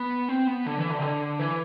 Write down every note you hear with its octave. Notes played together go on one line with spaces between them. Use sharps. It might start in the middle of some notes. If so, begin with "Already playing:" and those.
Already playing: B3
C4
B3
D3
E3
D3
C3
D3
E3